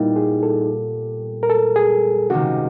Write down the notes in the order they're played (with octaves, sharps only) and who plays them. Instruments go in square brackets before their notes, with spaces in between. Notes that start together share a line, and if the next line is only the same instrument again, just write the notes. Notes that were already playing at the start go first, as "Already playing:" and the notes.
Already playing: [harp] A#2 G3 B3 [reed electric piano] D#4 E4
[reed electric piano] G#4
A4
A#4
A4
G#4
[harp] C#2 C3 D#3 [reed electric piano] F#4